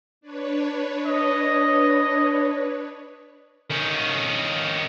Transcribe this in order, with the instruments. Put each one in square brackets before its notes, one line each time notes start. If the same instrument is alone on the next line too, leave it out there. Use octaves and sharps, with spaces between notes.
[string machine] D4 B4 C#5
[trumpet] D#5
[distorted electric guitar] D#3 C#4